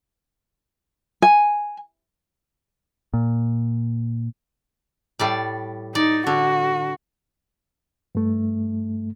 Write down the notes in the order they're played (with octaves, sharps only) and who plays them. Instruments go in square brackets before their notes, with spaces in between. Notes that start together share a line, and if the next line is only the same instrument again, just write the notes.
[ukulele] G#5
[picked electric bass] A#2
[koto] A2 G3 D5
[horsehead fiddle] D#4 [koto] D5
[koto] D3 [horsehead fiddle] F#4
[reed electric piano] G2 A3